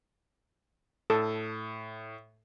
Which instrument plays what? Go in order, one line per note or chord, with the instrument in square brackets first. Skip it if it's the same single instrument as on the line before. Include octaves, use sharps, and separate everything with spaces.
[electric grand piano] A2 [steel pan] A4